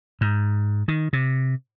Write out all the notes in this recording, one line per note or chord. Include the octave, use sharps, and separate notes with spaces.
G#2
D#3
C3